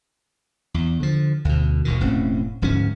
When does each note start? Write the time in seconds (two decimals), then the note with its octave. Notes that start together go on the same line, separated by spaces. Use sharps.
0.74 E2
1.00 D3 F3
1.45 D2 B2
1.85 D#1 D#2 B2 D#3
2.00 E1 A2 C4 C#4
2.62 D1 G#2 F3 C#4